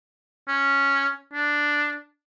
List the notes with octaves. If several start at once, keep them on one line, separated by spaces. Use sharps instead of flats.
C#4
D4